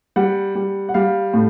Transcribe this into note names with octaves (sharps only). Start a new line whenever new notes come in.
G3 F#5
G3
F#5
G3 F5
A2